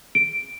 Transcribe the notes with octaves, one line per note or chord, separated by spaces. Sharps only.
D7